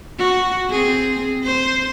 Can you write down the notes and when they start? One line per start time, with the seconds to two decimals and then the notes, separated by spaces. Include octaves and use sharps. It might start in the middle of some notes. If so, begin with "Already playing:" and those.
0.18 F#4
0.70 C4 G#4
1.43 C5